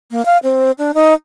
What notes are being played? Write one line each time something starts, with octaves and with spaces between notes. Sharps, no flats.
A#3
F5
C4
D4
D#4